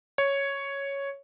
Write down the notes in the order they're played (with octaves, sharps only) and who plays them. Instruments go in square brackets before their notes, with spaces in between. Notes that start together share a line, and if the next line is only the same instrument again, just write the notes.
[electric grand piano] C#5